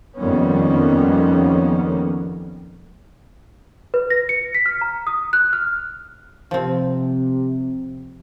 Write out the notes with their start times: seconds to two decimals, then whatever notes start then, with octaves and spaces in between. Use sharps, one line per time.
0.18 F2 D#3 G3 A#3 B3 C#4
3.94 B4
4.10 A#6
4.29 C#7
4.54 B6
4.66 F6
4.81 A#5
5.07 D#6
5.33 F#6
5.53 F6
6.51 C3 F3 C4